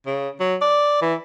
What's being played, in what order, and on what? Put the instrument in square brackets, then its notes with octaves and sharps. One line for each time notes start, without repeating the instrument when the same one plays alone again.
[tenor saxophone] C#3
F#3
D5
E3